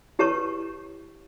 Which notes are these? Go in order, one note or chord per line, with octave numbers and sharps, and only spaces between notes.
E4 G4 B4 C#5 A5 C#6